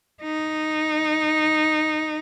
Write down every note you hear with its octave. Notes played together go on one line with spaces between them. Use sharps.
D#4